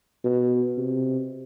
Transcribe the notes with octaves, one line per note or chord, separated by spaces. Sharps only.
B2
C3